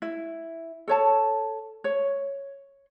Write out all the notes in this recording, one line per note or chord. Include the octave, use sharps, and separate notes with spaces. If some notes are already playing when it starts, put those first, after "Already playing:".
E4
A4 C#5 A5
C#5